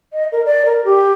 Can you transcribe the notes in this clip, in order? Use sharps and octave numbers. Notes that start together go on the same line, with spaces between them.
D#5
A#4
D5
A#4
G4